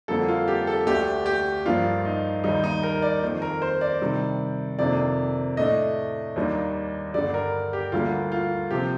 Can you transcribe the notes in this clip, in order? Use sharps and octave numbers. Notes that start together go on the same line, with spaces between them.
F2 D3 G3 A#3 A4
F4
G4
A4
D2 D3 A3 D4 G4
G4
G2 F3 A#3 D4 F4
D#4
D#2 D#3 G3 D#4
D#4
A#4
D5
F2 D#3 A#3
A#4
C5
D5
C3 D#3 G3 D4
F2 C3 D#3 A#3 D4 D5
A2 A3 D4 D#5
D#2 D#3 G3 A#3 D4
G2 D3 G3 D5
A#4
G4
D2 D3 G3 A#3 D4 F4
F4
C3 F3 C4 G4